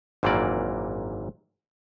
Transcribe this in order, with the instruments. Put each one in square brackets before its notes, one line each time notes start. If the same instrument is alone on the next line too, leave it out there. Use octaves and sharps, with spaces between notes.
[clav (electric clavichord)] G#1 F#2 A#2 E3 A#3 D5